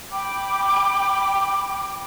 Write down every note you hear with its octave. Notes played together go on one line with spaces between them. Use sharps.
G5 B5 D6